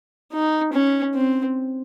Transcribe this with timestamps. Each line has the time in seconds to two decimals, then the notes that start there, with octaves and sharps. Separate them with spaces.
0.33 D#4
0.73 C#4
1.15 C4